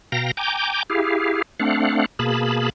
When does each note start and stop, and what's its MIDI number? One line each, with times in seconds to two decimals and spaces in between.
0.12 0.31 47
0.12 0.31 77
0.12 0.31 79
0.12 0.31 82
0.12 0.31 94
0.37 0.83 79
0.37 0.83 80
0.37 0.83 82
0.37 0.83 86
0.37 0.83 91
0.90 1.42 64
0.90 1.42 67
0.90 1.42 68
0.90 1.42 77
1.60 2.06 57
1.60 2.06 60
1.60 2.06 62
1.60 2.06 77
1.60 2.06 78
2.19 2.70 47
2.19 2.70 58
2.19 2.70 68
2.19 2.70 81
2.19 2.70 83